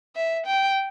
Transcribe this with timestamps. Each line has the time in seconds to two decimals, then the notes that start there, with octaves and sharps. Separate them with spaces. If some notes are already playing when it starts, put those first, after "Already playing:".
0.15 E5
0.46 G5